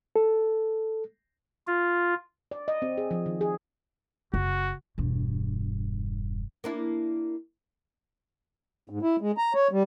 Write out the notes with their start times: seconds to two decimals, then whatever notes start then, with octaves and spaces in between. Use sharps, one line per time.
0.16 A4
1.67 F4
2.51 D5
2.68 D#5
2.82 C4
2.98 G#4
3.11 F3
3.26 D#3
3.41 G#4
4.34 F#1 F#4
4.98 E1 G2
6.64 A#3 D4 E4
8.90 G#2
9.02 E4
9.21 G#3
9.38 A#5
9.55 C#5
9.71 G3